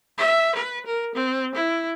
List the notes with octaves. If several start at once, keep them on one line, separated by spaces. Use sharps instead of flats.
E5
B4
A#4
C4
E4